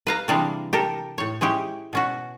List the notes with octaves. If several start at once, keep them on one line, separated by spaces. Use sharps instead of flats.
B4 F5 A#5
C3 E3 G3 G#3 D4 F5
G4 A4 A#4
A2 C#5
G#3 C#4 E4 G4
B2 C#4 F#4